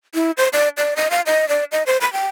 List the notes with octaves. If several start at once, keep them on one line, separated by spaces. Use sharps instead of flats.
E4
C5
D5
D5
D#5
F5
D#5
D5
D#5
C5
B5
G5